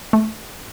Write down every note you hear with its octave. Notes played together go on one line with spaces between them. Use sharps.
A3